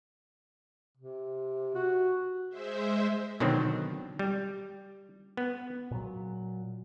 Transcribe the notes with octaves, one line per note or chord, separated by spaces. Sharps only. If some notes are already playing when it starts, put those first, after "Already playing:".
C3
F#4
G#3 C5 E5
B2 D3 D#3 F#3 C4
G3
B3
A#2 F#3